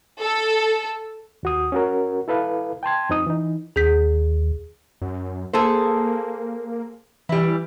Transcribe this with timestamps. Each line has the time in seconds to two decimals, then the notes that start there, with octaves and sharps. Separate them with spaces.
0.20 A4
1.43 D#2 F#4 D#6
1.72 C#4 F#4 A#4
2.28 E4 A4 B4 F5
2.83 G5 A5 C6 G#6
3.09 F2 C4 D#4 D#6
3.26 E3 D#4
3.76 D#2 G#4 G6 B6
5.01 F#2
5.53 A#3 G#4 A4 C5
7.29 E3 G3 E4